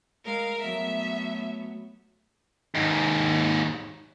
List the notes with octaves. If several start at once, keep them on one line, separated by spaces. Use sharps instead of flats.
G#3 A#4 F5
F#3 A3 B3 E5
D#2 G#2